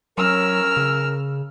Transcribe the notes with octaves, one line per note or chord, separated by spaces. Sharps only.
F#3 C#4 A#4 E6 F6
C#3